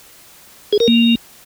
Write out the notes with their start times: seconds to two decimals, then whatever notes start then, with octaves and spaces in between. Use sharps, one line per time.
0.73 G#4
0.80 A#4
0.88 A#3